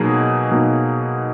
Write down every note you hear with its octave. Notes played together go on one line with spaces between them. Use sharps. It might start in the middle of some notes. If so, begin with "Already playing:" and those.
Already playing: B2 F#3 A#3 D#4 G#4
B2 F#3 A#3 D#4 G#4